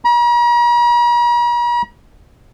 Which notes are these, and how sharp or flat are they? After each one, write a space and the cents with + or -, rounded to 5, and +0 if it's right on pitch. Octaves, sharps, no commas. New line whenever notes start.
A#5 +45